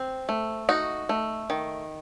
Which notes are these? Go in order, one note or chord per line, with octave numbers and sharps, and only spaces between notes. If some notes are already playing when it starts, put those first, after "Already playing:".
Already playing: C4
A3
D#4 F#4
A3
D#3